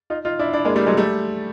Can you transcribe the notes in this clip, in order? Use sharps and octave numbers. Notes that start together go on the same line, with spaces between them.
D#4 F4
D#4 F4
D4 E4
D4 E4
G#3 A#3
G3 A3
F#3 G#3
G3 A3